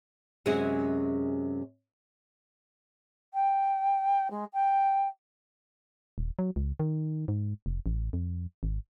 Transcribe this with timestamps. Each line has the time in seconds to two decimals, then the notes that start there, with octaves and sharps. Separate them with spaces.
0.46 F#2 C3 G#3 C#4 F#4 G#4
3.34 G5
4.31 G#3
4.53 G5
6.18 D#1
6.39 F#3
6.56 C#2
6.80 D#3
7.28 G#2
7.66 F1
7.86 A1
8.13 F2
8.63 G#1